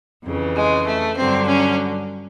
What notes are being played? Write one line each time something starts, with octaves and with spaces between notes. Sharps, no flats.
F2 C#3 E3
G#3
A3
G2 D3 F#3 C4
C#4